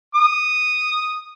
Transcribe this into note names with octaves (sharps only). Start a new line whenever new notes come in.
D#6